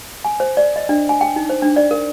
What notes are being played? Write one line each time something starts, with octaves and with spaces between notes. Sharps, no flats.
G#5
C5
D5
D#5
D4
G#5
G5
D#4
C5
D4
D5
A#4